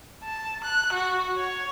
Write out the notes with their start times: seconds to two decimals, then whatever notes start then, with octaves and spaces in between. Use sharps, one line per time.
0.23 A5
0.64 F#6
0.93 F#4
1.37 C#5